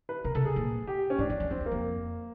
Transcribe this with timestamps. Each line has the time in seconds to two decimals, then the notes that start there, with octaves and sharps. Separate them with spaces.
0.09 B4
0.24 C3 A#4
0.35 C3 A4
0.45 G#4
0.56 A#2
0.87 G4
1.10 C#4
1.19 A2 D4
1.30 F2
1.40 F2
1.50 E2 C4
1.61 E2
1.66 A#3
1.71 F2